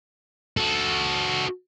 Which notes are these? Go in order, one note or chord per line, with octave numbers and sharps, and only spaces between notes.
F#4 A4